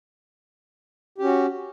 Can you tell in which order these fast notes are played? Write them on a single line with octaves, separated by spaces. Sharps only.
G4 C#4 F#4